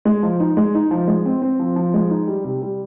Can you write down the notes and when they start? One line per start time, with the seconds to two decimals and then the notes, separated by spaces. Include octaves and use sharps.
0.05 G#3
0.23 F3
0.40 D#4
0.57 G#3
0.75 D#4
0.91 F3
1.08 G#3
1.26 C4
1.42 C4
1.60 F3
1.76 F3
1.94 G#3
2.10 D#4
2.27 G3
2.44 C3
2.62 G3